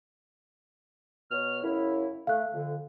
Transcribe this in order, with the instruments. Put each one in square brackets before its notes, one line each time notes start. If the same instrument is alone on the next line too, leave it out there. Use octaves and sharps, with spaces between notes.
[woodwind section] B2 C#5 F6
F#2 C#3 E4
[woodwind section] A3 [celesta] F5 F#6
[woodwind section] F2 D3